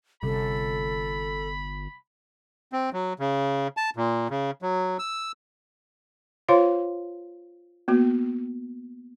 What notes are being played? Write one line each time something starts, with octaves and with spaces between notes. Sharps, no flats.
G1 C3 G3 A4 B5
C4
F#3
C#3
A5
A#2
C#3
F#3
E6
F4 C5 C#5 F5 C6
A#3 B3 F#4